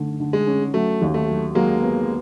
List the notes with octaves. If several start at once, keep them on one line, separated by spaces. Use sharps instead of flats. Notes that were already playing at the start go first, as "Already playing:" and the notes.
Already playing: D3 A3
D3
G#3
C#4
F#3 A3
D#2
A3
F#3
F#3 G#3 A#3
B3